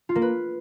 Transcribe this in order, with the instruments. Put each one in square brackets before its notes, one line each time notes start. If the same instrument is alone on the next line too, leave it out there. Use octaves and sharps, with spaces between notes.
[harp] F4
A#3
B4